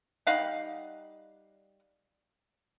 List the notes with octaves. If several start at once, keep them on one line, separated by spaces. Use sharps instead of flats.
G3 D#4 F5 F#5